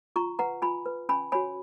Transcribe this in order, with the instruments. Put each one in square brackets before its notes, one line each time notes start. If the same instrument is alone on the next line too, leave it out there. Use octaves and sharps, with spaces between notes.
[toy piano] F4 A#5 C#6
B4 F#5 A#5
F4 G#5 B5
B4
C#4 G#5 B5
F#4 C#5 G#5 B5